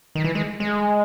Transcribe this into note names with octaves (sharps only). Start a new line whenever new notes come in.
D#3
E3
G#3
G#3